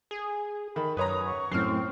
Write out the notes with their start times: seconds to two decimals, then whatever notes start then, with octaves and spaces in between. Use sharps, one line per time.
0.11 G#4
0.76 D#3 B5
0.97 F#2 B4 C#5 A#5 D#6
1.26 C#6
1.52 F#2 A2 C4 F6 C7